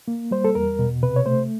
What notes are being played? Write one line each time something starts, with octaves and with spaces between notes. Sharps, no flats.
A#3
G3 C5
A4
E2 A#4
B2
C3 B4
C#5
A3 C5